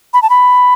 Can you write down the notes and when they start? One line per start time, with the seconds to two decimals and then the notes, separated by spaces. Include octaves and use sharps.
0.13 B5
0.22 A5
0.30 B5